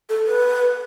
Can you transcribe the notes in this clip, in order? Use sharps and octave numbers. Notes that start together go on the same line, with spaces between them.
A4
B4